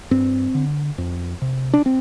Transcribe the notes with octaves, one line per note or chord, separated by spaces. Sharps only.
G2 C4
D3
F2
C3
D4
C4